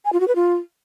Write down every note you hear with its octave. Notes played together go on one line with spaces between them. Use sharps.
G#5
F4
F#4
B4
F4